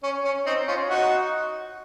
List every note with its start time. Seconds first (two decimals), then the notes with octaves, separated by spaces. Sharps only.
0.03 C#4
0.25 C#4
0.46 C4 D#4
0.68 C#4 F4
0.89 D#4 F#4